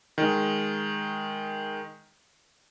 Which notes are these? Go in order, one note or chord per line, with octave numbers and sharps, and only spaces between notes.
D#3 G#3